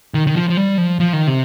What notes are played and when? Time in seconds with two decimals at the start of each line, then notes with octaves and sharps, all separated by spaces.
0.14 D#3
0.27 D#3
0.35 F3
0.49 F3
0.57 G3
0.78 F3
0.99 F3
1.13 D#3
1.27 C3